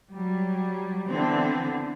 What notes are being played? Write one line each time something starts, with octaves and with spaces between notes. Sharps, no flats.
F#3 G3
D3 E3 B3 C4 D4